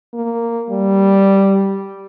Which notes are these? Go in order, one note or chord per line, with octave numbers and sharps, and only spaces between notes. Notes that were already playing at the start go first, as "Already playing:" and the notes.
A#3
G3